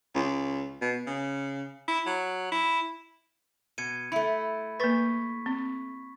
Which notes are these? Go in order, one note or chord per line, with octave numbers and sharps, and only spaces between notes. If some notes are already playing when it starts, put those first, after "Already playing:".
C#2
B2
C#3
E4
F#3
E4
B2 G#6 C#7 D#7
A3 E4 E5 B5 C#7
A#3 B4 C#6 A6 B6
C4